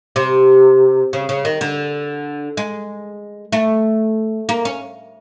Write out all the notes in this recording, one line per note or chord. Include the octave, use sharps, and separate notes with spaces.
C3
C#3
C#3
D#3
D3
G#3
A3
A#3
C#4